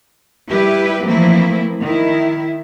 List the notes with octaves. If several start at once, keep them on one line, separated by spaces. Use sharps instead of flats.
G3 E4 G4 B4
E3 F3 A3 A#3 C4 E4
D#3 E4